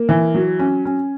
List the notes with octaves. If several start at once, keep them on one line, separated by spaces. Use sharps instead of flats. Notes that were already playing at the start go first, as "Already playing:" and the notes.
Already playing: A#3
E3
F#3
C#4
C#4